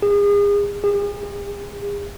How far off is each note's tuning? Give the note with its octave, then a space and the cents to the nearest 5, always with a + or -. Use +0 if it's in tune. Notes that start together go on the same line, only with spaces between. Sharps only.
G#4 -35
G#4 -45